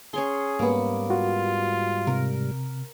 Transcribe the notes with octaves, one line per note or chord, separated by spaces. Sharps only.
C#4 G#4 C#5 C6
G#2 G3 A#3 B3
F4 F#4
C3 A#4